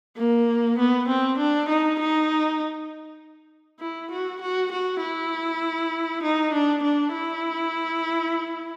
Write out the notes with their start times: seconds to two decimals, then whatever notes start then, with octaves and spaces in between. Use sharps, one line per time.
0.17 A#3
0.79 B3
1.08 C4
1.38 D4
1.69 D#4
1.99 D#4
3.80 E4
4.11 F#4
4.42 F#4
4.72 F#4
5.01 E4
6.23 D#4
6.53 D4
6.83 D4
7.13 E4